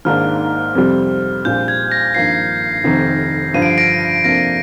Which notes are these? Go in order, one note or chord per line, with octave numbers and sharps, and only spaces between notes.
G#1 G#2 D#3 A#3 D4 F6
F2 C3 G3 C4
A#1 A#2 G3 C4 G6
G#6
A#6
G#1 G2 F3 A#3 C7
F1 F2 C3 D#3
G2 D3 F3 D#7
D7
C7
A#6 D7
F2 C3 F3 A#3 D4 A#6